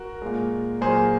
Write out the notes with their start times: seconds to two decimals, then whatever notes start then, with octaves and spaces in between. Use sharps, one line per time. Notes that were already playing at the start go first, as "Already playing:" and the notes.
Already playing: F#4 A#4
0.22 A#2 G#3
0.81 A#2 F#3 A#3 G#4 C5